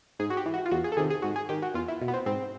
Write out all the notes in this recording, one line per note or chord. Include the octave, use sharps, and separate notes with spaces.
G#2 G#4
F#4
G4
E3
F#4
F4
E2 F#4
G#4
A4
C3 D#3 G#4
G#4
G#2 F#4
G#4
D#3 G4
F#4
E2 F4
E4
B2
B3
C4
G#2 C4